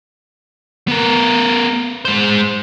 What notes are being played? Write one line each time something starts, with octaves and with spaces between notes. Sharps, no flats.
B3 A#4
G#3 C5